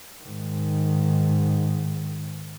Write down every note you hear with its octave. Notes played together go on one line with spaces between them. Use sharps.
G#2 D#3